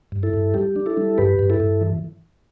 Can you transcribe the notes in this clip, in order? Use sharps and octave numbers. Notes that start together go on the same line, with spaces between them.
G2
E4 A4
G2
G3 G4
D4
E4 A4
G3
G2 G4 B4
G2
E4 A4
G2
E3